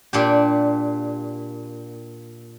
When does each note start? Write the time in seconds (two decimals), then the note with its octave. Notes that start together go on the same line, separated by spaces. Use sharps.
0.13 A#2 D4 G4